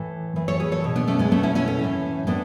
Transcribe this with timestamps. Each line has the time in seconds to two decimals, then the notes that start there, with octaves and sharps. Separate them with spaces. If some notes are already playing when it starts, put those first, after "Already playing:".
Already playing: A2 E3 A4
0.36 A2 E3
0.48 A4 C#5
0.60 G#4 B4
0.72 A4 C#5
0.84 B2
0.96 B3 D4
1.07 A3 C#4
1.19 G#3 B3
1.31 B2 A3 C#4
1.43 C#4 E4
1.55 C#4 E4
1.68 A3 C#4
1.79 A2 E3
2.27 A2 E3 B3 D4